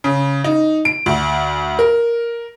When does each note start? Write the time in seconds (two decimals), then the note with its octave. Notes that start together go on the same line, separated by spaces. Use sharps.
0.04 C#3
0.44 D#4
0.85 D7
1.06 D2
1.79 A#4